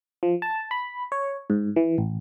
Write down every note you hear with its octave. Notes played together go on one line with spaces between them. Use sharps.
F3
A5
B5
C#5
G#2
E3
A1